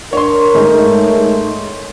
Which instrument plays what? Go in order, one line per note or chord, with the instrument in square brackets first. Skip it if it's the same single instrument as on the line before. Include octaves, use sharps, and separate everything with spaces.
[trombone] D4 [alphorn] A#4 [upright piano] C#5 C6
[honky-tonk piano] G#2 G#3 [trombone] A3